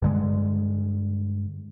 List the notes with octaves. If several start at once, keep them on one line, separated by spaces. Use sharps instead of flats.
G2 D3 G#3